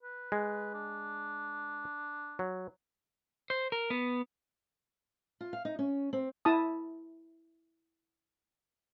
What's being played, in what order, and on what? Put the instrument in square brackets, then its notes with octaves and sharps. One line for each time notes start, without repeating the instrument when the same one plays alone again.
[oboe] B4
[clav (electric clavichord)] G#3
[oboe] D4
[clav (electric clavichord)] F#3
[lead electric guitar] C5
A#4
B3
[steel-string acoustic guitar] F4
F5
D#4
C#4
C4
[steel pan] E4 A5 D#6